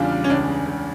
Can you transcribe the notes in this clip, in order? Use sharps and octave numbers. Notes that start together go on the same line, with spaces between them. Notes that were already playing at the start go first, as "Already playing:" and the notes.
Already playing: E2 C#3 G3 D4 F4
G3
C#4
C#2 D4
C#3
C#2